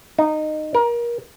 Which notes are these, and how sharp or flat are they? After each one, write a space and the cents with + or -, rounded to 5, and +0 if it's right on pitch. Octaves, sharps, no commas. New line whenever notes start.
D#4 -15
A#4 +25